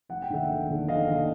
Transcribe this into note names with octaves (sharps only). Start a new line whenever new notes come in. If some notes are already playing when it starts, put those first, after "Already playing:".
F1 F#5
G5
D#2 D3 E5 F#5
F1
D#2 D3
F1 D#5 F5
D#2 D3